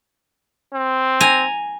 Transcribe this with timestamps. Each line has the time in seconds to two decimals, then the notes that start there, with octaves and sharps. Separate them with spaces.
0.73 C4
1.21 G#5 A#5